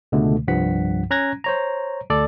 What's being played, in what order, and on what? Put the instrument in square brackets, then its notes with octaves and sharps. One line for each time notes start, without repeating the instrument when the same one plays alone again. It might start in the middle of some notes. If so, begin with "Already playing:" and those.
[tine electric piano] C#2 B2 D3 G#3 A3
C2 G2 F3 F#5 B6
C#4 A#5 F#6 G#6 A#6
C5 C#5 A#5
D2 A4 D5